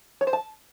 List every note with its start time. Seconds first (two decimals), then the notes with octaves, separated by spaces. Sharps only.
0.21 C#5
0.27 C5
0.33 A5